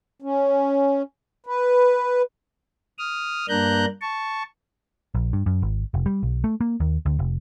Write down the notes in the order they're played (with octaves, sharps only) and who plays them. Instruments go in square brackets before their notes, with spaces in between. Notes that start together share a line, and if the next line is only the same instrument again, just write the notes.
[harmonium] C#4
B4
[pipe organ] D#6 F6
G2 A#3 D4 A#5 F#6 G6
A5 C#6
[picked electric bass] A#1
G2
F#2
G#1
F1
G3
B1
A3
A#3
D#2
D2
F1